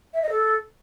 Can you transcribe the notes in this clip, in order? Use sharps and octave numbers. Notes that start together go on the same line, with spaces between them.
E5
D#5
A4